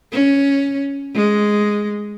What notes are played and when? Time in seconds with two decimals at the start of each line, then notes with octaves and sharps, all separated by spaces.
0.12 C#4
1.15 G#3